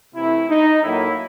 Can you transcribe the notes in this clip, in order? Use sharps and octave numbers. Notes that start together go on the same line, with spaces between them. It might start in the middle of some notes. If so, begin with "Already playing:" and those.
C3 E3 A3 E4
D#4
A2 F#3 A#3 E4